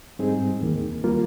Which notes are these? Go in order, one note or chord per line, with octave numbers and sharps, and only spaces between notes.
G#2 G3 C4 D#4 G#4
D#2 D#3 A#3
G3 A#3 F4